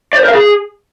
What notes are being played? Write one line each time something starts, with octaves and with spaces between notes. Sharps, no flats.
D5
C5
A#4
F5
G#4